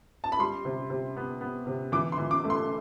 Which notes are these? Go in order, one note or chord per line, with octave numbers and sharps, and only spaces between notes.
A5
B5
G3 C6
C3
C3
B3
B3
C3
E3 D6
C6
E3
D6
A3
C6